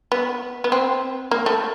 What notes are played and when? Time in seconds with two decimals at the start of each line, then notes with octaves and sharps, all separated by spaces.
0.12 B3
0.64 B3
0.72 C4
1.31 A#3
1.46 A3